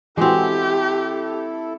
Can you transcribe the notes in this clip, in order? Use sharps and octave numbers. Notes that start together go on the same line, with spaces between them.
E3 G#3 C4 E4 F#4 G4 A4